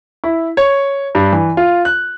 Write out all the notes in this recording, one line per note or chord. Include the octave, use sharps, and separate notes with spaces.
E4
C#5
G2
E3
F4
F#6